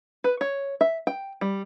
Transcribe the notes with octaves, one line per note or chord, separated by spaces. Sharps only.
B4
C#5
E5
G5
G3